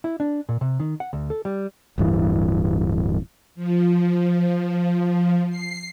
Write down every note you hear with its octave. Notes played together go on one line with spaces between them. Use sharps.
E4
D4
A#2
C3
D#3
F#5
D2
A4
G3
D1 G2 E3
F3
C7